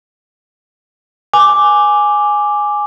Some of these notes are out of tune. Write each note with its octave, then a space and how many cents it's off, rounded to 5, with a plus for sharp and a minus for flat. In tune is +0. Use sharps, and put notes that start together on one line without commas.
G#5 +0 D6 +0